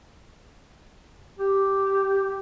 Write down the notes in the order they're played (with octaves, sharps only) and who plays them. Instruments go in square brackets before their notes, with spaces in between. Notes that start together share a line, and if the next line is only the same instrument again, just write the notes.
[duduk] G4